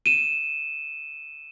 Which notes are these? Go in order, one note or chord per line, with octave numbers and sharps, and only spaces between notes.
D#7 E7